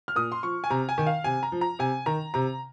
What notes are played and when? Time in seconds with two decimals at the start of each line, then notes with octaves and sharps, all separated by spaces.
0.08 F6
0.15 A#2 D#6
0.32 C6
0.43 F3 C#6
0.64 G#5
0.70 C3 A#5
0.89 G#5
0.98 D#3
1.07 F5
1.24 C3 G#5
1.43 A#5
1.52 F3
1.61 A#5
1.79 C3 G#5
2.06 D#3 A#5
2.34 C3 A#5